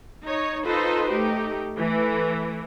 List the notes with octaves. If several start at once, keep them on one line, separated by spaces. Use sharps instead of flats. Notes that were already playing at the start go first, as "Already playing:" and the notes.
D#4 C#5
D#4 F4 A4 B4 C5
A3 D#4 G4
E3 A3